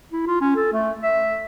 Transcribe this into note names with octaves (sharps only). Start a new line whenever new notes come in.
E4
F4
C#4
A4
A3
E5